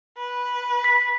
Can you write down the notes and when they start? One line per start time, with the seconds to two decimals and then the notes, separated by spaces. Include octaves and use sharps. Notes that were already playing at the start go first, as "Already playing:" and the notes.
0.18 B4
0.84 B6